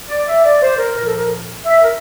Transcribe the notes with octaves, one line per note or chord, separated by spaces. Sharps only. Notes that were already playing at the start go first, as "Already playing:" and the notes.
D5
E5
D5
C5
A#4
A#2 F3 A#4
A4
A#4
E5
A#4